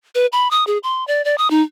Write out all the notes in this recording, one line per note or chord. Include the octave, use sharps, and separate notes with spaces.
B4
B5
D#6
G#4
C6
D5
D5
D#6
D#4